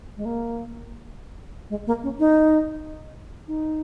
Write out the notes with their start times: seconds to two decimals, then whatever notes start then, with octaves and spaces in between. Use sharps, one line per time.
0.17 G#3
0.25 A#3
1.70 G#3
1.87 A#3
2.03 C#4
2.19 D#4
3.48 D#4